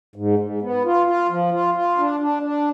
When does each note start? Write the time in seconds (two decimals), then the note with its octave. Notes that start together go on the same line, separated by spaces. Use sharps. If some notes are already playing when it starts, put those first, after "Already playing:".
0.16 G#2
0.39 G#2
0.62 B3
0.85 F4
1.06 F4
1.29 F3
1.52 F4
1.74 F4
1.98 D4
2.20 D4
2.43 D4